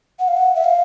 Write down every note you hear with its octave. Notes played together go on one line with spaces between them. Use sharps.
F#5
F5
F#5
E5
F5